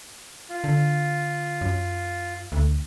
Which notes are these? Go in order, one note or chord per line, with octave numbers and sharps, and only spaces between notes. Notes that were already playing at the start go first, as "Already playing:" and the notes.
F4
D3
F#2
D2